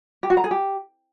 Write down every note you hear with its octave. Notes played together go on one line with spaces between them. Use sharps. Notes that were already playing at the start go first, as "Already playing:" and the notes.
G4
F#4
A#5
G#4
G4